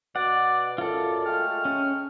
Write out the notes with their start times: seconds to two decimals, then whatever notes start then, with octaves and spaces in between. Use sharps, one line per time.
0.16 B2 D5 F#5
0.78 F#2 F4 A4 D5
1.26 G#3 A3 G5 F6
1.65 C#4